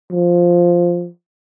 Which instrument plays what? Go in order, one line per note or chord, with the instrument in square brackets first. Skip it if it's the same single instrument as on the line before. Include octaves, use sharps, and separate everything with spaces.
[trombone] F3